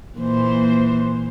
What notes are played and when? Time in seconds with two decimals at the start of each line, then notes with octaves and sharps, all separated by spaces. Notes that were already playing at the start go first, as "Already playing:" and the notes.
0.17 A#2 E3 C5